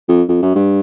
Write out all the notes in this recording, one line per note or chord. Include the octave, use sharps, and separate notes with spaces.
F2
F2
F#2
G2